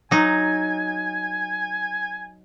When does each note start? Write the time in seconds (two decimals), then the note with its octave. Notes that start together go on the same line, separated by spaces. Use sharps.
0.11 F#3 D#4 G#5